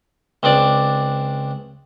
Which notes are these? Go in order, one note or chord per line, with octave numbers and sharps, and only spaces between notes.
C#2 C4 D4 D5